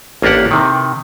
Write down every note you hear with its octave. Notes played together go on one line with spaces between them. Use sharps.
A1 A#3 D4 G4 F#5
C3 D#3